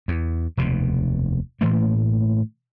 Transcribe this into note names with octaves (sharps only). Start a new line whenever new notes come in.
E2
F1 D#2 B2
A2 E3 A3 A#3